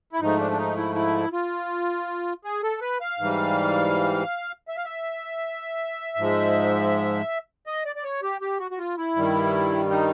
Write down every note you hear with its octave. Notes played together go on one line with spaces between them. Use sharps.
E4
G#2 F3 A3 D#4
D4
D4
D#4
E4
E4
F4
G#4
A4
B4
F5
G#2 E3 G3
E5
F5
E5
G#2 F3 G#3
D#5
D5
D5
C#5
G4
G4
F#4
F#4
F4
E4
G2 D#3 G3
D#4